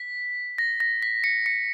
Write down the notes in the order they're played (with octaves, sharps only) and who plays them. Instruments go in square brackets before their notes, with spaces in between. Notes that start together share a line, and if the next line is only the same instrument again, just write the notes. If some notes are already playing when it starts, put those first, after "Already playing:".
Already playing: [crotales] B6
A#6
A#6
B6
C#7
C#7